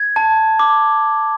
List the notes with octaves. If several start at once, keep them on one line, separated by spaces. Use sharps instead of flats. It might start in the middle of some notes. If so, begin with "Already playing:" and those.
Already playing: G#6
A5
D6